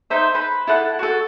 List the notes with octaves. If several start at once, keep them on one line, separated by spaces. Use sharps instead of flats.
D#4 C5 E5
B4 B5
E4 A4 F#5 F#6
F#4 A4